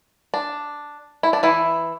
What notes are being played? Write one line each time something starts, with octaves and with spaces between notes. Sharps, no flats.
D4
E4
D4
E3 E4